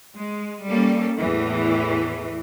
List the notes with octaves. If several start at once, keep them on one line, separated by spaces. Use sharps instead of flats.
G#3
G3 A#3 C#4 A4
E2 A2 E3